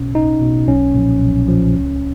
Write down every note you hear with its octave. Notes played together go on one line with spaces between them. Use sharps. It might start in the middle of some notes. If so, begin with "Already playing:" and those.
Already playing: B1 B2 C#4
B1 D#4
B2
B1 C#4
A#2 F3
B1
A#2 F3
C#2